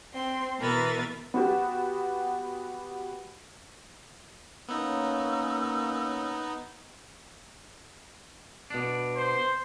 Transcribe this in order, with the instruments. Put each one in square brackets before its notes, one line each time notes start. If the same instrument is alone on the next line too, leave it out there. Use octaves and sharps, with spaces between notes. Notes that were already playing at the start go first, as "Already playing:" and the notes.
[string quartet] C4 C6
B2 E3 A#4 B4 E5 A6
[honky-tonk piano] B3 F#4 G4
[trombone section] A#3 C#4 [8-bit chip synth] B3 D#4 [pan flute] E6
[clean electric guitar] B2 D4
[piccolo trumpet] C5